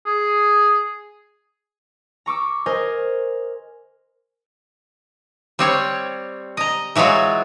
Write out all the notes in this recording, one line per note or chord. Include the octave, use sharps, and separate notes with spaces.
G#4
A#5 C#6 D6 E6
A#4 C5 D#5 G#5
G3 C4 C#5
D#5 A#5
E3 F#3 G#3 F4 F#4